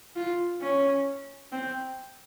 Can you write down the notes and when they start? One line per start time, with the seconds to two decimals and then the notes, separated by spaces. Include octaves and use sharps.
0.16 F4
0.61 C#4
1.52 C4